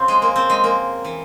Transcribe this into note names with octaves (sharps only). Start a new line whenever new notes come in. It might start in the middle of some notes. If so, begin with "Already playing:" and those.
Already playing: F2 C#3 F3 C4 F4
G#3
A#3
C4
G#3
A#3
E3